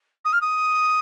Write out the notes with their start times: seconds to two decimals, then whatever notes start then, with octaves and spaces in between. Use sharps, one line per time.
0.24 D#6
0.32 F6
0.40 D#6